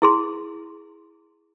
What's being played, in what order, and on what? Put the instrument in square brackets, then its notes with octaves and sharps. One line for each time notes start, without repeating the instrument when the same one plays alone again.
[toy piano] E4 G#4 C6